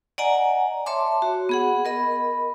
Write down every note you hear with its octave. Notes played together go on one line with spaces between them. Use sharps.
D5 D#5 F#5 G#5 A#5
C#5 E5 A5 C6 D6
F#4
B3 G#4 F#5
A#4 D#5 B5